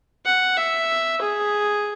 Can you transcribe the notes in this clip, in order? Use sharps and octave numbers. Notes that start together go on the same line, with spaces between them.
F#5
E5
G#4